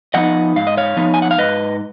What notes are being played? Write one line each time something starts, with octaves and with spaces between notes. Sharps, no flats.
F3 B3 D#4 D#5 F#5
G#2 F5
D#5
C#5 F5
F3 B3 D#4
G#5
F#5
F5
G#2 B4 D#5